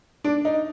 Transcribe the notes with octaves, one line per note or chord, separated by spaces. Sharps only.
D4
D#4